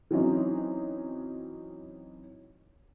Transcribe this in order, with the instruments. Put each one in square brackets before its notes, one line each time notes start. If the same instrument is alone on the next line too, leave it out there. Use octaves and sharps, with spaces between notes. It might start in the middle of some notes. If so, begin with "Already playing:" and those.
[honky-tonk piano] E3 F#3 C4 C#4 D#4